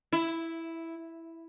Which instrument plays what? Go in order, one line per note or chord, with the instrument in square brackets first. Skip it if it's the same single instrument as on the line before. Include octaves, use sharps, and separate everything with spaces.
[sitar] E4